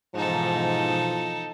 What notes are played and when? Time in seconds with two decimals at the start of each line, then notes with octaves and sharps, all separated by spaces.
0.15 G#2 B2 E3 F3 D#4 A4